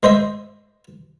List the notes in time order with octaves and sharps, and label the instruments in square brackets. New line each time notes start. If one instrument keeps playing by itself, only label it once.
[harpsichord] G#3 C5 D#5 E5